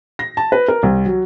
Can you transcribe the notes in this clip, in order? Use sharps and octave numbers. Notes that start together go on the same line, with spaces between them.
A#6
A5
B4
A#4
C2
F#3